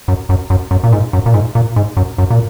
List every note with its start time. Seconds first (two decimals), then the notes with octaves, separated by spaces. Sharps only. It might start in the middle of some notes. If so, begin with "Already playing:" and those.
0.08 F#2
0.29 F#2
0.50 F#2
0.71 F#2
0.83 A#2
0.93 G#2
1.13 F#2
1.26 A#2
1.34 G#2
1.55 A#2
1.76 G#2
1.97 F#2
2.18 F#2
2.30 A#2